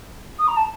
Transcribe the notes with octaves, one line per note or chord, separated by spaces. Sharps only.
D#6
A#5
A5